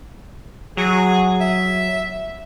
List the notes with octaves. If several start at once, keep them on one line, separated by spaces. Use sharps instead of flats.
F#3 G#4
E5